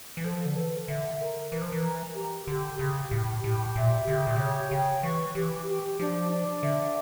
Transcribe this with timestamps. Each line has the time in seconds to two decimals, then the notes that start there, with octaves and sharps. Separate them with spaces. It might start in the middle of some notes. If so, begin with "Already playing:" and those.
0.17 E3
0.24 F3 A4
0.46 D3
0.56 E3 A4
0.88 D3 E5
1.20 A#4
1.51 E3 A#4
1.62 F3
1.72 E3
1.83 A#5
2.15 G4
2.47 D3 G4
2.79 C#3 G4
3.11 A2 G4
3.44 A2 G4
3.76 A#2 E5
4.07 D3 G4
4.17 C#3
4.27 A#2
4.36 C#3 C#5
4.71 C#3 G5
5.03 E3 C#6
5.35 E3 G4
5.67 G4
5.99 F3 D4
6.31 D4
6.63 D3 E5